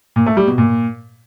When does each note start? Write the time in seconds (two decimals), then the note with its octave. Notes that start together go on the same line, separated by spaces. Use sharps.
0.16 A#2
0.26 A3
0.37 G3
0.47 B2
0.58 A#2